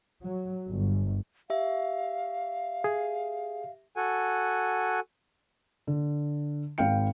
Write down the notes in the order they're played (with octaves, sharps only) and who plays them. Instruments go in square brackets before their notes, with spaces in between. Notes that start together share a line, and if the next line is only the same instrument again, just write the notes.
[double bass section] F#3
G1
[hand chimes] G4 E5 [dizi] F5
[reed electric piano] G#4
[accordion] F#4 A4 F#5 G#5
[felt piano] D3
G#1 F5 G5 C#7